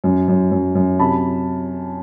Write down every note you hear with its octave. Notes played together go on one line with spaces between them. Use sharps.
F#2
F#2
F#2
F#2
C3 A5 B5